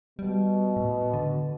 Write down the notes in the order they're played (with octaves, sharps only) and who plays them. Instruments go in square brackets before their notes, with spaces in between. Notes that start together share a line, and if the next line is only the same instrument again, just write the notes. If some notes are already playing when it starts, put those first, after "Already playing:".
[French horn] B2 [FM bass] G3
[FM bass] A2
D3